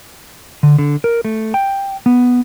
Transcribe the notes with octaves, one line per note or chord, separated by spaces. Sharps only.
D3
D3
A#4
A3
G5
B3